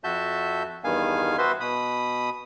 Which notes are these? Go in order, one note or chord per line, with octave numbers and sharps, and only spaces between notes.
F2 F#4 E5 A5 G6
E2 G2 D#3 B3 F5 G#5
B3 F#4 B4 C5 E5 C6
B2 B5 D#6